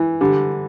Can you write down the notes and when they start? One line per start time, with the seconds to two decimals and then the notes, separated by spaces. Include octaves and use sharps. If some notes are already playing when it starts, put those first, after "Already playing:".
Already playing: E3
0.21 D3 G3